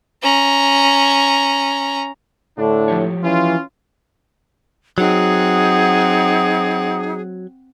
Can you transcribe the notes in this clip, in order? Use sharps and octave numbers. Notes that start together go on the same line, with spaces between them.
C#4 A#5
A2 D3 A3 D4
F3 G4 C#5
E3 C#4 F4
F#3 C4 D#4 G#4 F#5